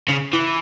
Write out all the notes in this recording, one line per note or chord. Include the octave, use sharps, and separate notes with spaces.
C#3
E3